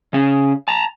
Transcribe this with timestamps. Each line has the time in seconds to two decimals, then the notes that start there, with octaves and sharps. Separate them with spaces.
0.13 C#3 C#4
0.68 A5 A#5